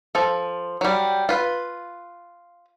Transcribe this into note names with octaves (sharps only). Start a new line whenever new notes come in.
F3 A4
F#3 G3
F4 B4